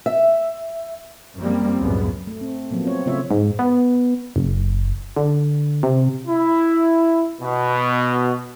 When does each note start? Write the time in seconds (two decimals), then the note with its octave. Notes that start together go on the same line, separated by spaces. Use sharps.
0.06 E5
1.37 F#2 F3 G3 A#3 C4
1.81 C#2 F#2 A2 C#3 F#3 B3
2.27 A3
2.41 C4
2.71 F3 F#3 A#3 B3
2.85 C4 C#5
3.06 C#3 A3 F4 C#5 E5
3.31 G#2
3.59 B3
4.36 F#1
5.17 D3
5.83 C3
6.28 E4
7.41 B2